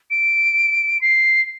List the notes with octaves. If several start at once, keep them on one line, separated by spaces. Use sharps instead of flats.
D7
C7